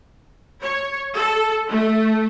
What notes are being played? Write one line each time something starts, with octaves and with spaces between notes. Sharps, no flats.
C#5
A4
A3